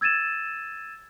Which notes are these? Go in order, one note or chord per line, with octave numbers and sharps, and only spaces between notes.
E6 G#6 A6 D#7 E7